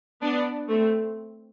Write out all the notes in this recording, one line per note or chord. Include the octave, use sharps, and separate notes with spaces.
B3 D4
A3 C4